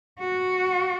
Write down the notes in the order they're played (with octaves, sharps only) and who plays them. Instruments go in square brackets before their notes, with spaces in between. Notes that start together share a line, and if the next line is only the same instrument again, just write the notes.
[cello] F#4